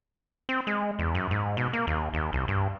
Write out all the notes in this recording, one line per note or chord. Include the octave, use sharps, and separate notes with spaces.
C4
G#3
E2
F#2
G#2
B2
A#3
D#2
D#2
C2
G2